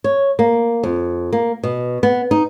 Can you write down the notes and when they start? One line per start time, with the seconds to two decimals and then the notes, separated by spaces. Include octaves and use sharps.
0.04 C#5
0.39 A#3
0.83 F2
1.33 A#3
1.63 B2
2.03 B3
2.31 D#4